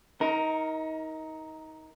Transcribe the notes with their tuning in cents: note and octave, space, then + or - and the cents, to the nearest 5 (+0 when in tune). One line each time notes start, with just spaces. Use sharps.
D#4 +25 A#4 +0